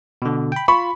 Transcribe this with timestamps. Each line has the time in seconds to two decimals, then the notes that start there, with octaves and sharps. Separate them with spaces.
0.22 B2 D3
0.52 G5 B5
0.68 F4 B5 C#6